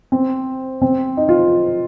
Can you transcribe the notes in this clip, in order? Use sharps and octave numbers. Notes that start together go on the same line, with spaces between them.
C4
C4
D#4
F4